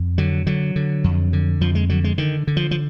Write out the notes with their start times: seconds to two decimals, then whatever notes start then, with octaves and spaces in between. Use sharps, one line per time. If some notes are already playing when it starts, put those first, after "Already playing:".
Already playing: F2
0.18 D3 F#3
0.46 D3 F#3
0.76 D3
1.04 F2
1.33 D3
1.61 F2 F3
1.75 G#3
1.89 D3 F#3
2.04 G#3
2.18 D3 D#3
2.47 D3
2.57 F3
2.71 F3